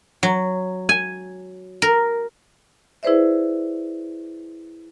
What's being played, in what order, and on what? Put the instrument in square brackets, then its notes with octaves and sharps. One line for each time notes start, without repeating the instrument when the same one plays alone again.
[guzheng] F#3
G#5
A#4
[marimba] E4 G#4 B4 C5 D5 E5